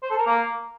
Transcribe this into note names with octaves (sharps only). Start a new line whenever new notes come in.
C5
A4
A#4
A#3